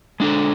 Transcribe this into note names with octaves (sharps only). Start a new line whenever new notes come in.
G#3 D4 A4